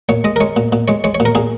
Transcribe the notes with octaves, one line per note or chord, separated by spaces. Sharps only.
A#2 C#5
G#3 D#5
A#4
G#3 C#5
A#2
A#2
G#3 C#5
G#3 C#5
C#5
A#2
A#4
A#2 G#4